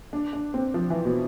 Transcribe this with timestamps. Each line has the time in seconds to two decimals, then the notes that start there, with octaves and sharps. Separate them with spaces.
0.13 D4
0.33 D4
0.54 C4
0.74 F3
0.90 E3
1.05 B2